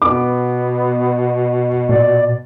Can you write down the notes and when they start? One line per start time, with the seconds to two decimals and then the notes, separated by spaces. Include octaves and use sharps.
0.02 B2 B3 D6
1.89 A#2 D5